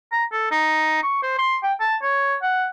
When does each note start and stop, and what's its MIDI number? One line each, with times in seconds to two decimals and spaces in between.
0.12 0.24 82
0.32 0.51 69
0.51 1.02 63
1.03 1.21 85
1.23 1.37 72
1.39 1.56 84
1.63 1.73 79
1.80 1.96 81
2.03 2.36 73
2.42 2.67 78